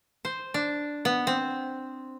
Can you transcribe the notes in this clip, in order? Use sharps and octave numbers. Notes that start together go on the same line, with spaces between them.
C5
D4
B3
C4